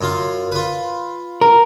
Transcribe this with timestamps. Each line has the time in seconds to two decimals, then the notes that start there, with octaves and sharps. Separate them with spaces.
0.01 F#2 F4 F5
0.52 F4 B4
1.41 A#4